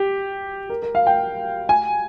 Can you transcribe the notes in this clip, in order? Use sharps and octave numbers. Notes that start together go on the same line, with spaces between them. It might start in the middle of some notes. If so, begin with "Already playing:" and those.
Already playing: G4
A#4
A#4
F5
G5
G#5